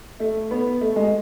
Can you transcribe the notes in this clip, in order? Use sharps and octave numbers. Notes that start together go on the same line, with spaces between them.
A3
B3
A3
G#3